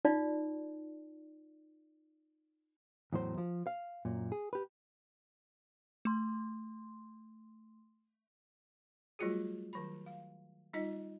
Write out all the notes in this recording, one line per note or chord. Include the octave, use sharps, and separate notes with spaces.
D#4 F4 D5
E2 A2 F#3 C5
F3
F5
F#2 A#2
G#4
G4 B4
A3 C6
F#3 G3 A3 F4 F#4 G#4
D#3 F#3 B5
F5
G3 D#4 F4 D#5